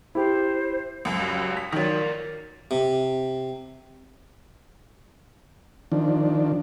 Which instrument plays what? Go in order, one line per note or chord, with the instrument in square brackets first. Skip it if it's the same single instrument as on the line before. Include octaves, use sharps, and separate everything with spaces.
[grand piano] E4 G4 [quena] C5
[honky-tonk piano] C#2 F#2
[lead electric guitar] G3 F#4
[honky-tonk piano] B6
[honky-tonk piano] D#3 F#3 [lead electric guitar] A#4 D5
[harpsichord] C3
[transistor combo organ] D#3 F3 D4